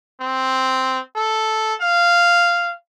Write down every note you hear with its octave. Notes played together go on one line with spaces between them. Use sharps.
C4
A4
F5